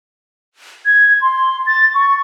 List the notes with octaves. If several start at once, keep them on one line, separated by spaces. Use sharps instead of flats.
G#6
C6
A6
C#6